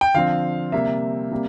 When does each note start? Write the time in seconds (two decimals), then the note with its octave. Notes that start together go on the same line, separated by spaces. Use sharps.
0.01 G5
0.14 D3 F3 C4 F5
0.72 C3 G3 A#3 E5
1.31 C3 G3 A#3